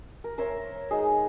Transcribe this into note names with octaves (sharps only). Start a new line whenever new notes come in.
A#4
A#4 C5 C#5 E5
G#3 D#4 G#4